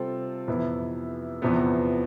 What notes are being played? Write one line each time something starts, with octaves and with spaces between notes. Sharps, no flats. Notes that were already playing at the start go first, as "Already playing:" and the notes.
Already playing: C3 G3 C4 F4 A4
F2 C3 E3 B3 E4
E2 C3 F3 B3